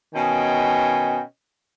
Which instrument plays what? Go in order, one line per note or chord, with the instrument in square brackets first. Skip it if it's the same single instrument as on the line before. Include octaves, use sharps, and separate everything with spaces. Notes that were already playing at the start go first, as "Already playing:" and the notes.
[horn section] B2 D#3 C#4 D#5 G5 G#5